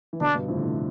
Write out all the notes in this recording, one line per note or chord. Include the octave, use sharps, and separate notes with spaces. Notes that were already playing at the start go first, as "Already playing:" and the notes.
E3
B2 D3 D4
G2 B2
F2 A2
D3
A2 C3